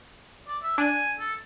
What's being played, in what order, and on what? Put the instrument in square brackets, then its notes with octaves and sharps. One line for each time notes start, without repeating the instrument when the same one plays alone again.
[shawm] D5
E5
[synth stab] D4 [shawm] G#5
[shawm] A4